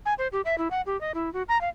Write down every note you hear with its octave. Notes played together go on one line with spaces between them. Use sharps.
G#5
C5
G4
E5
E4
F#5
G4
D#5
E4
F#4
A#5
F5